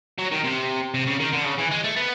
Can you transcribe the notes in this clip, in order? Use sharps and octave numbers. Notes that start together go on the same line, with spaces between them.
F#3
D#3
C3
C3
C#3
D#3
D3
C#3
E3
G#3
A3
B3